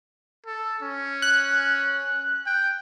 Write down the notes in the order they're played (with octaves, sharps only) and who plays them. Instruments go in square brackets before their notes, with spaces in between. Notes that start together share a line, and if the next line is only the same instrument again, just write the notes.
[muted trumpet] A4
C#4
[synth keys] F#6
[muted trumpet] G5